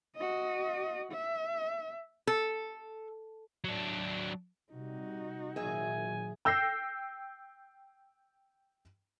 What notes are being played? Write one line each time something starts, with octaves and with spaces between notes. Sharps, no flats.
F#4 D#5
E5
A4
F#3 D4
C3 G3 D#4 F#4
A#2 D#3 F#3 G#4 E5 G#5
G5 E6 G6 A#6 C7